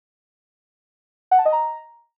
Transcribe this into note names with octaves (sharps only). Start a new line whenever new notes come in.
F#5
A5
D#5
A#5